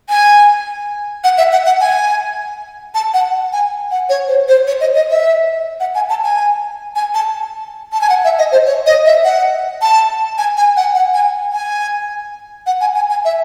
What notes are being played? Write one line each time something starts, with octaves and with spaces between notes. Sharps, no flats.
G#5
F#5
E5
F#5
F#5
G#5
A5
F#5
G#5
F#5
C#5
C5
C5
C#5
D#5
D#5
E5
F#5
G#5
A5
G#5
G#5
A5
A5
G#5
F#5
E5
D#5
C5
C#5
D#5
E5
F#5
A5
G#5
G#5
F#5
F#5
G#5
G#5
F#5
G#5
G#5
G#5
E5